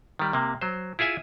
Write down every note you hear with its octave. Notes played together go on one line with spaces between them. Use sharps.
D#3 G3
C3 A#3
F#3 C5
E4 F4 G#4 E5 G#5